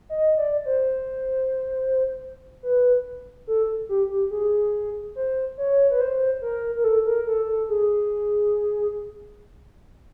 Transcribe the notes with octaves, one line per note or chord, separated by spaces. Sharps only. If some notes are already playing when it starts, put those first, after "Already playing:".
D#5
D5
C5
B4
A4
G4
G4
G#4
C5
C#5
B4
C5
A#4
A#4
A4
A#4
A4
A4
G#4